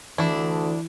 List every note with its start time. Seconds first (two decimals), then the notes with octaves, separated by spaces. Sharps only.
0.18 D2 E3 D4 E4